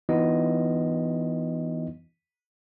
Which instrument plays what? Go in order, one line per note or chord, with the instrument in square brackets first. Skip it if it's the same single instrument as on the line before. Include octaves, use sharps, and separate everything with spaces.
[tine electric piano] E3 B3 D#4 F4 D#5